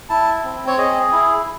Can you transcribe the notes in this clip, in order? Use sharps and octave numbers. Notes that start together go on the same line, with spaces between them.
E4 A5
C4
C#5
G#4 D#5
E4